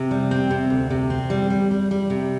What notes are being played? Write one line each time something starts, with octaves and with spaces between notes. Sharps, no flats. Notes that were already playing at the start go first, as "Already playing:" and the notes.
Already playing: C3
G3
C4
C3
D2
C3
C4
G3
G3
G3
G3
C3